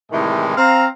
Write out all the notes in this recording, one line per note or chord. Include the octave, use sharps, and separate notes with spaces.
A2 C3 D#3 E3 G3 G#3
C4 F5 A#5